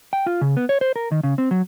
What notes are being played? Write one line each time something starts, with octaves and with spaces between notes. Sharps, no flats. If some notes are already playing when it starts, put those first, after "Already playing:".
G5
F4
C#3
B3
C#5
C5
A#4
D#3
C#3
C4
F#3